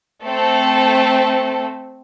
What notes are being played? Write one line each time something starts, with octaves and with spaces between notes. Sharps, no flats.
A3 C4 A4